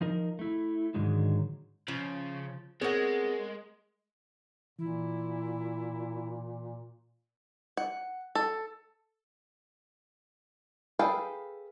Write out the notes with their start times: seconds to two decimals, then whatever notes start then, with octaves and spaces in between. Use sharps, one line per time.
0.01 F3 D#4 A#4
0.39 A3 E4
0.94 G#2 D3 D#3 F#3 G#3
1.88 C#3 F3
2.81 G#3 B3 C4 G#4 A#4 C#5 F#5 A#6
4.79 A#2 E3 E4
7.77 F#5
8.35 A4
10.99 G#4 A4 B4 F5 G5